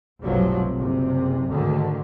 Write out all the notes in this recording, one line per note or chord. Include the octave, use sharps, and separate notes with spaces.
F1 B1 G2 C3 F3 F#3
F#1 C3
D2 G#2 D3 D#3